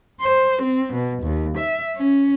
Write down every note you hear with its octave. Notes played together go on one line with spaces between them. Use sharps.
C5
C4
B2
D#2
E5
C#4